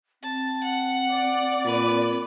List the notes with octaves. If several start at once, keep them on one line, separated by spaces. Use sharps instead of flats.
C4 A5
F#5
D5
A#2 B4